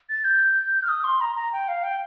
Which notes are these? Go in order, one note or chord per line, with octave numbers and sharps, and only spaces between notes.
A6
G6
F6
D#6
C6
A#5
A#5
G5
F5
G5